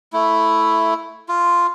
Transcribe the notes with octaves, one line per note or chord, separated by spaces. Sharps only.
A3 E4
F4